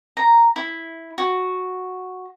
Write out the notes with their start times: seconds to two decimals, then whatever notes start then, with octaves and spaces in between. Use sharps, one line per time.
0.17 A#5
0.56 E4
1.18 F#4